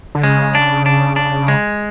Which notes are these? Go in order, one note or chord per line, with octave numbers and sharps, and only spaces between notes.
D3
C#3 G#3
D4
D4
D4
G#3